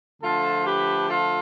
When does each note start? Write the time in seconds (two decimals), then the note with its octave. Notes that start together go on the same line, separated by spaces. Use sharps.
0.22 D3 F3 A3 F4 A4
0.65 G4 B4
1.08 F4 A4